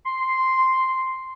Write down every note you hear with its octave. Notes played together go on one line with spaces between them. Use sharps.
C6